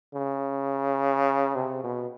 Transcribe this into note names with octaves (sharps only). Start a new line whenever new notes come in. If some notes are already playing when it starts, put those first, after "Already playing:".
C#3
C3
B2